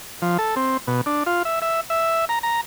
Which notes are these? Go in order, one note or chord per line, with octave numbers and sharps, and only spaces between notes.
F3
A4
C4
B2
D4
F4
E5
E5
E5
A#5
A#5